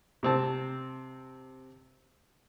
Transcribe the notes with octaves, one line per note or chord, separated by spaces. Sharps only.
C3 C4 A5